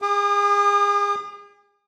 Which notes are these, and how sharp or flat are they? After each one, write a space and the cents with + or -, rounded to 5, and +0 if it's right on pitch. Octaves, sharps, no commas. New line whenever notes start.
G#4 -35 D6 +45